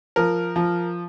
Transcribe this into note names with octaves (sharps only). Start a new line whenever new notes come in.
F3 A#4
F3